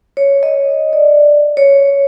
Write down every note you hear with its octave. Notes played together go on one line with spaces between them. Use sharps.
C#5
D#5
D5
C#5